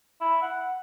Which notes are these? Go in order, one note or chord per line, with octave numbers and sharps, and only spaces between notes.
E4
F#5